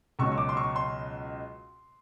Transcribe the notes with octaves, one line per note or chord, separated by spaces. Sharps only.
C#2 B2 F#3 C#6
C#6
D6
C6
C#6
C6